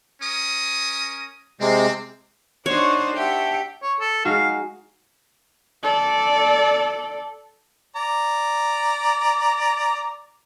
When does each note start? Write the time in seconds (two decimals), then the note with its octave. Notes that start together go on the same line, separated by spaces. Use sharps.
0.22 C#4 A#4 D#6
1.61 C3 G#3 C4
2.66 D4 D#4 F#4 C5 C#5
3.16 G4 E5 F#5 G5 A5
3.83 C#5
4.00 A4
4.25 G#3 D#4 F#4 F5
5.83 A4 D5
7.96 D5 A#5